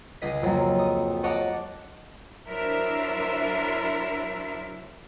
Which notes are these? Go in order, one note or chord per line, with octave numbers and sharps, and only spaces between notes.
C#2 G#4 D#5 B6
F2 C#3 F#3 A#3
D#6
C#5 D#5 F#5 A5 C#6 D6
F#3 D4 E4 A#4 C5 E5